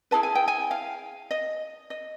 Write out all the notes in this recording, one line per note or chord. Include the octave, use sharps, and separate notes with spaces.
E4 G#4 B4 A5
G#5
G5
G#5
F5
D#5
D#5